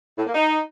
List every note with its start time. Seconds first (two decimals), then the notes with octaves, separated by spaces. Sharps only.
0.18 A2
0.26 A#3
0.34 D#4